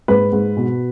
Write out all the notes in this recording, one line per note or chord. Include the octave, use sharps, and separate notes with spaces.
G#2 B4
G#2
B2